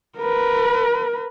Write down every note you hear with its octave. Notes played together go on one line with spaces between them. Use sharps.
A#4 B4